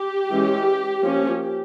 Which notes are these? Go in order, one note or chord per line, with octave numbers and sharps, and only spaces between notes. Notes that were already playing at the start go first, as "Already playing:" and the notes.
Already playing: G4
E3 G#3 C#4
F3 A#3 C#4